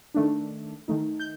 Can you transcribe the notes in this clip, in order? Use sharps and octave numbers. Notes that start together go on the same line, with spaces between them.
D#3 A3 D4
D#3 A3 D#4
G6